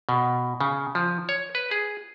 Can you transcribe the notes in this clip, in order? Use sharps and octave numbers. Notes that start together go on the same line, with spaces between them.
B2
C#3
F3
C#5
B4
G#4